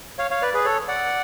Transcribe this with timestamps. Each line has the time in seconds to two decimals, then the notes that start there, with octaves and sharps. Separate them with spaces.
0.19 C#5 F5
0.31 C#5 F5
0.42 B4 D5
0.54 G#4 B4
0.65 A4 C#5
0.88 D5 F#5